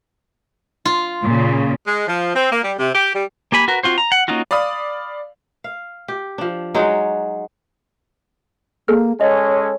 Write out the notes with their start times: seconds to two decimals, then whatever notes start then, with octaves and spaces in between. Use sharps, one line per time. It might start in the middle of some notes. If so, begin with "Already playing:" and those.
0.85 F4
1.23 A#2 C#3
1.87 G#3
2.08 F3
2.36 C4
2.52 A#3
2.64 G3
2.79 C3
2.95 G4
3.15 G3
3.52 A#3 G4 G#5 B5
3.68 F#4 A#4 B4
3.83 C4 F4 F#4 C5
3.98 A#5
4.12 F#5
4.28 A#3 C#4 D#4 F4 F#4
4.51 D5 F5 B5 D#6
5.64 F5
6.08 G4
6.38 F3 D4
6.74 F#3 G#3 D#4 F#4
8.88 A#3 G#4 A4 F6
9.21 G#3 C#4 A4 C#5 D#5